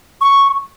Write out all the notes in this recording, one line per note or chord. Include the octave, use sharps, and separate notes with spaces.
C#6